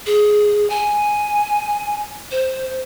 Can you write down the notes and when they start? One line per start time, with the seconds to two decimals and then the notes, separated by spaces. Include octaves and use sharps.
0.06 G#4
0.70 G#5
2.31 C5